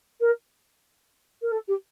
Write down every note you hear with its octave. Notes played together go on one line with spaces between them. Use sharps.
A#4
A#4
A4
G4